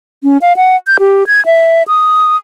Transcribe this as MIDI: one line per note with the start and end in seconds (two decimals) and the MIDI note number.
0.23 0.37 61
0.42 0.53 77
0.57 0.76 78
0.87 0.97 91
1.00 1.27 67
1.27 1.44 92
1.46 1.83 76
1.88 2.36 87